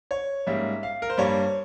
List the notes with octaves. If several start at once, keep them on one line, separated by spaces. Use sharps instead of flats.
C#5
G#2 G3 A#3 C#4 E5
F5
A#4
C5
G2 G3 A#3 C#5